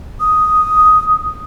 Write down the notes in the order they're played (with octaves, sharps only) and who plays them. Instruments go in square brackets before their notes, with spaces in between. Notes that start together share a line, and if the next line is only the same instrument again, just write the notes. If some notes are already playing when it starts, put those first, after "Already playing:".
[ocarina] D#6